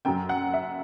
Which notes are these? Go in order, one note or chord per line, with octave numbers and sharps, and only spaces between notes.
F#2 F#3 G5
F#5
E5